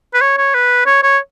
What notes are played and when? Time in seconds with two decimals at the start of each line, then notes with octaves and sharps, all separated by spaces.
0.14 B4
0.21 C#5
0.37 C#5
0.54 B4
0.86 C#5
1.03 C#5